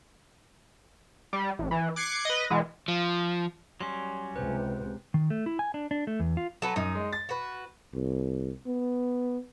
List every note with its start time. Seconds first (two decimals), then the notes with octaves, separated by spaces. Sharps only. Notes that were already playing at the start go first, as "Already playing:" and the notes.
1.33 G3
1.59 A1
1.71 E3
1.96 D6 F#6 G#6 C7 C#7
2.25 B4 D#5
2.50 B2 E3 G#3
2.88 F3
3.81 F#3 G3 C#4 C6
4.36 C#2 C3 B4 C5
5.14 D#3
5.30 A3
5.46 E4
5.59 G#5
5.74 D4
5.91 D4
6.07 A3
6.20 E2
6.37 F4
6.62 F#3 A4 B4
6.76 F#2 D#4
6.95 G#3
7.13 A6
7.29 F#4 B4
7.94 C2
8.67 B3